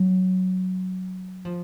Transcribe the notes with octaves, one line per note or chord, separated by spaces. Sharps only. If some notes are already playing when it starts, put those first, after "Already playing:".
Already playing: F#3
F3